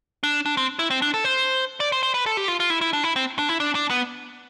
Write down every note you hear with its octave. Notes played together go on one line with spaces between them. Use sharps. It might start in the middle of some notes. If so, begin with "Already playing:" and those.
D4
D4
C4
E4
C4
D4
A4
C5
D5
C5
C5
B4
A4
G4
F4
F4
E4
E4
D4
E4
C4
D4
E4
D4
D4
B3